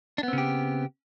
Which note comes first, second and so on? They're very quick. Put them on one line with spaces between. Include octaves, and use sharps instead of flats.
D4 B3 C4 C#3 G4